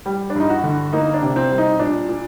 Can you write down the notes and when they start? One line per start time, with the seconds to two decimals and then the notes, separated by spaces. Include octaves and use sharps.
0.06 G3
0.30 D4
0.35 G2 D#4
0.50 F#4
0.64 D3
0.93 A#3 D#4
1.14 D4
1.22 C3
1.36 C4
1.51 G3
1.58 D#4
1.79 A#2 D4
2.09 A#2